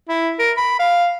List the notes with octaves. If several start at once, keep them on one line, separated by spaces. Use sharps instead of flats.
E4
A#4
B5
F5